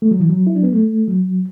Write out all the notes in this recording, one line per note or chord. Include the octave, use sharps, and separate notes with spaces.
A3
F#3
E3
F#3
E4
D4
B3
A3
F#3